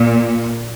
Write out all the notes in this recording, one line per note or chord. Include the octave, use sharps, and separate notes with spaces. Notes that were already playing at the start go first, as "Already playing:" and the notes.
Already playing: A#2